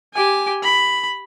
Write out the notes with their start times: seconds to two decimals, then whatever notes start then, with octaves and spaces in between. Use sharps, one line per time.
0.14 G4 G#5
0.63 B5